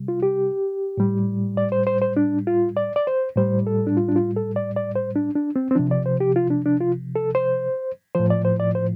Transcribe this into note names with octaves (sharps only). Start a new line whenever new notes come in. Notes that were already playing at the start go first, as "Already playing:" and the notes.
Already playing: C3 G3
F4
G4
A2 G3
D5
C5
C5
C5
D4
F4
D5
D5
C5
A2 G3 C5
A4
D4
F4
D4
F4
A4
D5
D5
C5
D4
D4
C4
C4
C3 F3 D4
D5
C5
G4
F4
D4
D4
F4
A4
C5
A2 F3 C5
D5
C5
D5
C5